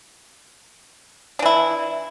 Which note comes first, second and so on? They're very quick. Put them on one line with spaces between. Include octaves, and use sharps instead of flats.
D4 E3 E4